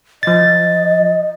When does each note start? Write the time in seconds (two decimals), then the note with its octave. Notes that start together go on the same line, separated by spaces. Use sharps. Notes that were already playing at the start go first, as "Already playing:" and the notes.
0.23 F3 D#5 A6